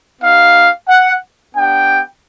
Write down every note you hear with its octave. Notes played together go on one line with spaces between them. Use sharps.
B3 D#4 G4 F5
F#5
B3 D4 G4 G5